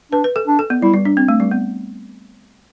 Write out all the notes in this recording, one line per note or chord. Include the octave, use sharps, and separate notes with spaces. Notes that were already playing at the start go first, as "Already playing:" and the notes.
D4 B4
B4
A4
D4
A4
B3
G3 E4
G3
D4
C4
A3
G3
B3